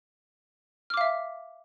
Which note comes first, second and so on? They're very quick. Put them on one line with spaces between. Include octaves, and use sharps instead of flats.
F6 D6 F5 E5